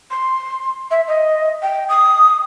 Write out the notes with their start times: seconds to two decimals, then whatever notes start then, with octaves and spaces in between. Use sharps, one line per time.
0.11 C6
0.91 E5
1.08 D#5
1.62 G5
1.89 D#6